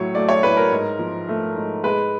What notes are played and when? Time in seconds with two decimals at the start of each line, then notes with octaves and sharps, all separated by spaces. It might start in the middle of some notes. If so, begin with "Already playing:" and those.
Already playing: A2 F#3 C#5
0.15 A3 D5
0.29 C#5
0.43 A2 B4
0.57 A#4
0.72 G#2
0.99 F3
1.28 A3
1.56 G#2
1.84 G#3 B4